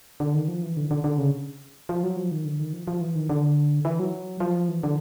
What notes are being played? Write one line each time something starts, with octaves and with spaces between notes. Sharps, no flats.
D3
D#3
F3
E3
D3
D3
D3
C#3
F3
F#3
F3
D#3
D3
D#3
F3
F3
E3
D#3
D3
E3
F#3
F3
E3
D3